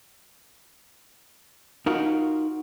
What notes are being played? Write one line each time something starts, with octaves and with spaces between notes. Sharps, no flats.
D#4 F4 F#4 A#4